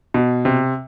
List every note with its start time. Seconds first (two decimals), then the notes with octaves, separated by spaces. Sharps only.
0.14 B2
0.45 C3